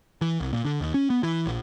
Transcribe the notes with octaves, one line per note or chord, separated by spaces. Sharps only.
E3
C2
A#2
D3
D#2
C#4
B3
E3
A#1